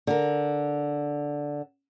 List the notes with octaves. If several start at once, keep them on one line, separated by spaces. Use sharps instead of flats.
D3 A#4